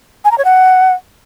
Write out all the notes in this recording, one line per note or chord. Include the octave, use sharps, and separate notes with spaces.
G#5
A#5
C#5
F#5